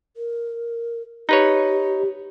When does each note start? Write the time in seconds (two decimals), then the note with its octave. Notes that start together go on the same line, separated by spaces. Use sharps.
0.16 A#4
1.29 D#4 G4 B4 C#5